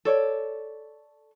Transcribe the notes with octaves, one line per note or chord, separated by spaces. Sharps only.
A4 C#5 D5